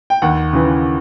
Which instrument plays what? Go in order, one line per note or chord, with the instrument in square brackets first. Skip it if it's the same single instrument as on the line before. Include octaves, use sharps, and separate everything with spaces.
[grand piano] G5
D#2 F#5
C#3 E3